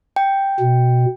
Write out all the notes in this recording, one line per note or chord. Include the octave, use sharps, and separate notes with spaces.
G5
B2